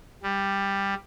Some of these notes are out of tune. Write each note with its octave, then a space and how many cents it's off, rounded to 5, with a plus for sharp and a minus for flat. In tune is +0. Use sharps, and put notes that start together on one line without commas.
G3 +10